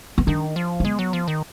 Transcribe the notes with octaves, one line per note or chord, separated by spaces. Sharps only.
B3
D#3 D4
F3
A#3
G#3 B3
F#3
F3
D#3